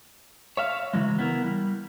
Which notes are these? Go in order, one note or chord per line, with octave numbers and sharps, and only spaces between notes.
C#5 E5 F5
C#3 E3 F#3 G#3
B3 E4 A#4
G3